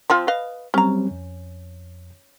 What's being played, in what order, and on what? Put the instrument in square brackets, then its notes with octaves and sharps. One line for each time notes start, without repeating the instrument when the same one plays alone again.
[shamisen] F3 C4 F4
B4 D#5 F5
[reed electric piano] F#3 G3 C4 [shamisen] C#4 A#5
[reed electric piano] F2